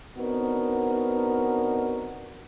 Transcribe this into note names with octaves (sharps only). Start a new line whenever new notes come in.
B3 C4 D4 D#4 F#4 A#4